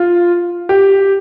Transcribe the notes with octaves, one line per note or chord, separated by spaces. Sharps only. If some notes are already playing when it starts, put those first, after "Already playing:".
Already playing: F4
G4